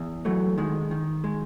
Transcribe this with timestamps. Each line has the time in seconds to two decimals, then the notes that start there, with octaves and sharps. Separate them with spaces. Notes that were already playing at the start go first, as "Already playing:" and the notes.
Already playing: E2
0.25 E3 F#3 A3
0.58 D#3 G#3
0.91 D#3
1.24 G#3